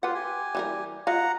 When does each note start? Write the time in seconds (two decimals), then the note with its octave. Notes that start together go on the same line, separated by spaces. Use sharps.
0.03 F4 G4 B4 F#5
0.15 G4 G#5
0.55 E3 G3 A#4
1.07 F4 D#5 F5 F#5 A#5